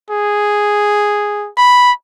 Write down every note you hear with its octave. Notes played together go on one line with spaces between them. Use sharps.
G#4
B5